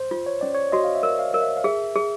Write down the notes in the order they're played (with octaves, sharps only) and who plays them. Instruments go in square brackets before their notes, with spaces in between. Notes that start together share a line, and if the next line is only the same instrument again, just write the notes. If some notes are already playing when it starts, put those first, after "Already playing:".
Already playing: [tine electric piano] C5
[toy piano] F4
[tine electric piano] C#5
[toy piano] C#4 [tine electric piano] D5
[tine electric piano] C#5
[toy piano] F#4 [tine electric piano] D#5
[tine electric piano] F5
E5
[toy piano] A#4
[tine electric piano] F5
[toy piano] A#4
[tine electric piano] E5
F5
[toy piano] G#4 [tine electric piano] E5
[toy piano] G#4